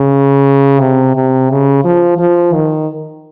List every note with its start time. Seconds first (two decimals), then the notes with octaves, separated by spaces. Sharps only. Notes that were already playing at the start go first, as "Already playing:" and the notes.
Already playing: C#3
0.80 C3
1.16 C3
1.50 C#3
1.85 F3
2.19 F3
2.53 D#3